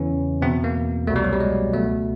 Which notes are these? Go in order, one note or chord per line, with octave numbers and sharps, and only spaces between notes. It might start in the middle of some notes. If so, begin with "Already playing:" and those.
Already playing: E2 C#3 E3 C#4
E2 B2 C4
A#3
C2 B2 A3
G3
F#3
G3
G#3
C#2 B2 A3